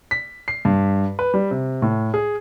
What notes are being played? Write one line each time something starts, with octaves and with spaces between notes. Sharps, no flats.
B6
C7
G2
B4
G3
C3
A2
G#4